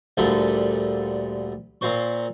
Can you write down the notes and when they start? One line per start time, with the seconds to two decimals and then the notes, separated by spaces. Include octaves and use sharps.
0.17 D2 A#2 D3 G3 A4
1.81 A#2 C4 C5 C#6